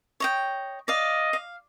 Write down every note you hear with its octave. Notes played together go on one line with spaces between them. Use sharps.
C#5 D#5 G5
D5 D#5 F5
F5